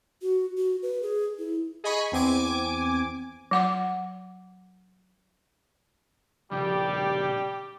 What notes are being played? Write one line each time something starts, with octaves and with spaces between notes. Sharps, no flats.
F#4
F#4
B4
G#4
E4
G#4 D#5 G#5 B5 C#6
E2 C4 G#5 D6
F#3 F#5 D6
A#2 C#3 F3 G3 G4